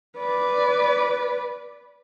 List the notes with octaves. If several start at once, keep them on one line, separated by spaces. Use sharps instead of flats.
B4 D5